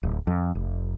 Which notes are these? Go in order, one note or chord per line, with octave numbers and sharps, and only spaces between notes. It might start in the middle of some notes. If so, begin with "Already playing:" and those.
D1
F2
F1